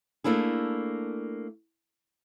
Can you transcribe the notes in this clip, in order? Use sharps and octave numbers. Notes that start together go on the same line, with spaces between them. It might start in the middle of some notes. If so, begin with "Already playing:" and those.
A3 A#3 D4 E4 G#4